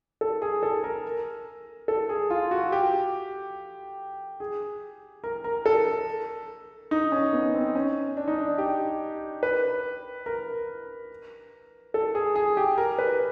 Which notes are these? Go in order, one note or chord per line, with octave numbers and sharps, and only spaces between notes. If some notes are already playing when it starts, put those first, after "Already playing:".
A4
G#4
A4
A#4
A4
G#4
F4
F#4
G4
G#4
A#4
A#4
A4
D#4
C#4
B3
C4
C#4
D4
D#4
D4
G4
B4
A#4
A4
G#4
G#4
G4
A#4
B4